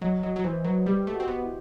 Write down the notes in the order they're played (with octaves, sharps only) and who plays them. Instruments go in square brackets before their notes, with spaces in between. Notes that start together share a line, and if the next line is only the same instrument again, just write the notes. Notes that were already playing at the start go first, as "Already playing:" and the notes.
[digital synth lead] F#3 [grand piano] D#5
[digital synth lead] F#3 [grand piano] D#5
[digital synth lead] F#3
[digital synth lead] E3 [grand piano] C5
[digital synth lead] F#3 [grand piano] B4
[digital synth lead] G3 [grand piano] G4
[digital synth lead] A3
[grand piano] F#4
[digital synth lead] C4
B3
[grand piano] E4